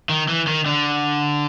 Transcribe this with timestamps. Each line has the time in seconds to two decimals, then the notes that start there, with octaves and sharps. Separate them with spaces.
0.09 D#3
0.28 E3
0.47 D#3
0.66 D3